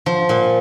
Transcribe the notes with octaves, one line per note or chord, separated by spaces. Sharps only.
F3
A#2